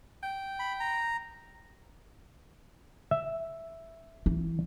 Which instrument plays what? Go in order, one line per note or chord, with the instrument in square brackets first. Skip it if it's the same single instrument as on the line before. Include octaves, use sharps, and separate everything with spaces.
[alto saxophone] G5
[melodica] B5
A#5
[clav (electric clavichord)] E5
[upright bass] E3